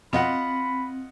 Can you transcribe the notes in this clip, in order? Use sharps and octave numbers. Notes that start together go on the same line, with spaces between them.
F2 B2 C4 F4 D#5 F#5 B5